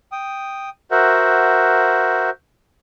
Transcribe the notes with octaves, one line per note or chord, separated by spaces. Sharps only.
G5 D#6
F#4 A#4 C5 E5 F#5